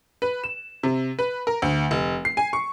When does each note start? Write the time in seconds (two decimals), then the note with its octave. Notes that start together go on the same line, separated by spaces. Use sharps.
0.22 B4
0.44 E7
0.83 C3
1.19 B4
1.47 A#4
1.62 D2
1.91 F1
2.25 C7
2.37 G#5
2.53 C#6